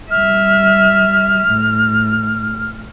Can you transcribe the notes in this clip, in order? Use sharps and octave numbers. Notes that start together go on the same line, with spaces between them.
G3 E5 F6
A2